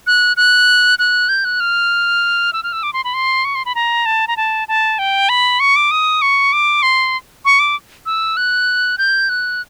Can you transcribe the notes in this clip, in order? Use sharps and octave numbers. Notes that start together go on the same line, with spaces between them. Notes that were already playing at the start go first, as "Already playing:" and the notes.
F#6
F#6
F#6
G6
F#6
F6
E6
F6
E6
D6
C6
B5
C6
C#6
C6
B5
A#5
A5
A#5
A5
A5
G5
B5
C#6
D6
D#6
C#6
D6
C6
C#6
D6
E6
F#6
G6
F#6